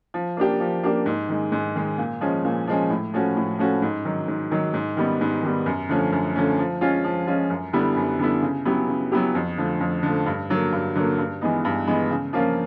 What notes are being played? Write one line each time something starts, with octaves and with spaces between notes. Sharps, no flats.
F3
A#3 D4 G4
F3
A#3 D4 G4
G#2
D#3 G#3
G#2
D#3 G#3
A#2
F3 G#3 C#4
A#2
F3 G#3 C#4
A2
F3 A3 C#4 F#4
A2
F3 A3 C#4 F#4
G#2
D#3 F#3
G#2
D#3 F#3
G#2
D#3 G3 B3
G#2
D#3 G3 B3
F#2
D3 F3 A3 C#4
F#2
D3 F3 A3 C#4
F3
G#3 C#4 F4
F3
G#3 C#4 F4
F#2
D3 G3 B3 E4
F#2
D3 G3 B3 E4
C#3
F#3 B3 E4 G4
C#3
F#3 B3 E4 G4
F2
D3 F3 A3
F2
D3 F3 A3
G2
D3 F#3 A#3
G2
D3 F#3 A#3
G2
E3 G#3 B3 D#4
G2
E3 G#3 B3 D#4
C#3
F3 A#3 C#4 F4